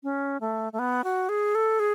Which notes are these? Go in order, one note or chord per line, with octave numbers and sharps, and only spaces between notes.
C#4
A3
A3
B3
F#4
G#4
A4
G#4